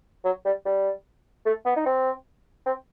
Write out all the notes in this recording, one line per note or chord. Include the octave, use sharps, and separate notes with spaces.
F#3
G3
G3
A3
B3
D#4
C4
C4